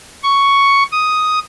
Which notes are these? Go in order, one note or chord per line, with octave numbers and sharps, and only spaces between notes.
C#6
D#6